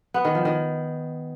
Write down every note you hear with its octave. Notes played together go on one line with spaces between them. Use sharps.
B3
D#3
F3
D#3